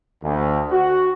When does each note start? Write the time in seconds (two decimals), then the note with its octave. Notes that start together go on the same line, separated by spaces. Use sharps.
0.24 D2
0.71 F#4